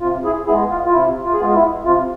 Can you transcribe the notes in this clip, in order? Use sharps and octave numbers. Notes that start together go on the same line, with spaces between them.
C3 F4
E4 G#4
G#3 B3 E4 G#4
F4
F4
C3 E4
F4
G#4
G#3 B3 F4
F4
E4
C3 F4